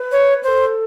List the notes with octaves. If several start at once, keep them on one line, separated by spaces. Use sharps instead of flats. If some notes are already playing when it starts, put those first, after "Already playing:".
Already playing: B4
C#5
A4 B4 C5